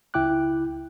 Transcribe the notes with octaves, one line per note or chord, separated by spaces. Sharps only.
C#2 E4 G5 D6 F#6